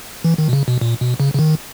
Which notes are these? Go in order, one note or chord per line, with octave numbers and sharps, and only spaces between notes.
E3
D#3
B2
C#3
B2
A#2
B2
C#3
C#3
D#3